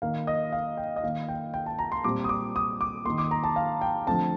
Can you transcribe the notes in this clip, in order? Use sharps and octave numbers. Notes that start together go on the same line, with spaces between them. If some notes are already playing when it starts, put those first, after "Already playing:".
D#3 A#3 F5
D#5
F5
G5
D#5
D#3 A#3 F5
G5
G5
A5
A#5
C6
A#2 G3 C4 D6
D#6
D6
D#6
D6
D#3 A#3 C6
D6
A#5
A5
F5
G5
D3 F3 A3 C4 A5